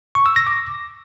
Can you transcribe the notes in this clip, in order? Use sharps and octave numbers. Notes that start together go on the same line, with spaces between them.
C#6
E6
A#6
D6